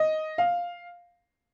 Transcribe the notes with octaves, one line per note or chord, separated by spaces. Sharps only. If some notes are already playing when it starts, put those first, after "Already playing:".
Already playing: D#5
F5